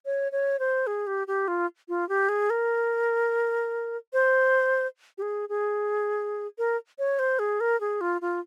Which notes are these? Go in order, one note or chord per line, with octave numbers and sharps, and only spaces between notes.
C#5
C#5
C5
G#4
G4
G4
F4
F4
G4
G#4
A#4
C5
G4
G#4
G#4
A#4
C#5
C5
G#4
A#4
G#4
F4
F4